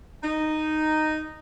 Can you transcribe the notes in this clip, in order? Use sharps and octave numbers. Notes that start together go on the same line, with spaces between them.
D#4